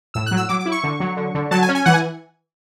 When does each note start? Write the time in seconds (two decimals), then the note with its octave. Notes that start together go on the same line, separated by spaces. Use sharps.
0.14 A2 E6
0.26 F#3 F#6
0.37 E6
0.49 F#3 D6
0.60 D6
0.66 E4
0.72 C#6
0.83 D3
1.00 F#3
1.17 D3
1.35 D3
1.51 F#3 A5
1.62 G#5
1.69 C#4
1.75 G#5
1.85 E3 F#5
1.94 G#5